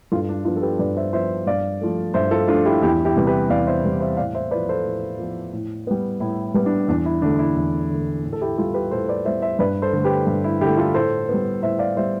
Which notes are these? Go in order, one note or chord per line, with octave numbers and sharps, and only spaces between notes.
G2 F4 A4
D4
F3 B3 D4 F4
A4
G4 B4
G2 B4 D5
C5 E5
F3 B3 C5 E5
G2 D5 F5
F3 A3
G2 C5 E5
F4 A4
F3 A3 D4 F4
E4 G4
E2 E4 G4
E4 G4
C3 G3 B3
G4 B4
E2 D5 F5
C5 E5
C3 G3 B3
C5 E5
A2 D5 F5
C5 E5
F3 B3 B4 D5
A4 C5
A2
F3 B3
A2
G3 B3
A2 E4
G3 B3
D4
E2 D4
E4
D3 A3 D4
E4
E2
D3 A3
A2
A4
E4 G4
G3 B3 F4 A4
G4 B4
A2 A4 C5
B4 D5
G3 B3 C5 E5
C5 E5
G2 B4 D5
A4 C5
D3 A3
G4 B4
G2
E4
D3 A3 E4 G4
F4 A4
A2 A4 C5
G3 B3
A2 C5 E5
D5 F5
G3 B3 C5 E5